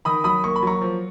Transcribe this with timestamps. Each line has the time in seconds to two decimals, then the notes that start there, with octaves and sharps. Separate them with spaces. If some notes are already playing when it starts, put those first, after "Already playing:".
0.05 D#3 B5 D#6
0.24 F#3 B5 D#6
0.44 A#3 C#6
0.56 B5
0.63 F#3 A#5 C#6
0.81 F3